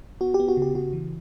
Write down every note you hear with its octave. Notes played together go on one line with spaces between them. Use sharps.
B3 F#4
G4
B3
F#4
C#3 G4
C#3 F#4
E3